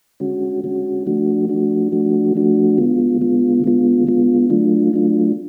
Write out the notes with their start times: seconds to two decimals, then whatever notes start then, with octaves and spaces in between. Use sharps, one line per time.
0.20 D3 G#3 C#4 F#4
0.64 D3 G#3 C#4 F#4
1.07 F3 A3 D4 F#4
1.49 F3 A3 D4 F#4
1.92 F3 A3 D4 F#4
2.35 F3 A3 D4 F#4
2.78 D3 G#3 B3 F4
3.21 D3 G#3 B3 F4
3.64 D3 G#3 B3 F4
4.07 D3 G#3 B3 F4
4.50 F#3 A3 D4 F4
4.93 F#3 A3 D4 F4